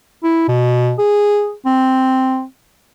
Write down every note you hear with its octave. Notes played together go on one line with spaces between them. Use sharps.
E4
B2
G#4
C4